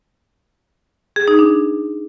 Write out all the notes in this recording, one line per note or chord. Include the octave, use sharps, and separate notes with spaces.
G#4
D#4
D4